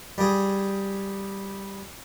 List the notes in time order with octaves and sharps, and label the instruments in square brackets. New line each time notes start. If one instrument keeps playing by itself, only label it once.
[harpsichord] G3 G#4